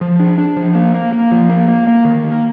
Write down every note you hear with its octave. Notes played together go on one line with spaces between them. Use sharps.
F3
D4
D4
F3
A#3
A#3
A#3
F3
A#3
A#3
A#3
D#3
A#3